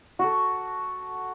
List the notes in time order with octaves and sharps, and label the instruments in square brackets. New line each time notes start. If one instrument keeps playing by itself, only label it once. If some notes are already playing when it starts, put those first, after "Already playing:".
[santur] F#4 A4